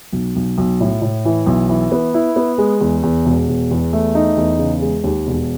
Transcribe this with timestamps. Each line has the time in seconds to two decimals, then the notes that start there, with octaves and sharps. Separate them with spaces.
0.12 B1
0.36 B1
0.58 B1
0.81 A2
1.02 A2
1.25 E3
1.46 B1
1.69 E3
1.92 B3
2.14 E4
2.36 B3
2.58 G#3
2.81 E2
3.03 E2
3.25 E1
3.48 E1
3.71 E2
3.93 A3
4.15 D#4
4.37 E2
4.59 C#3
4.82 G#3
5.04 D#2
5.27 E1